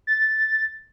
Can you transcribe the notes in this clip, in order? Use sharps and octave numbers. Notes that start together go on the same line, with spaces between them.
A6